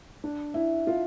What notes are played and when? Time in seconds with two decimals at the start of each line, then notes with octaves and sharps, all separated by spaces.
0.24 D4
0.54 E4
0.87 F4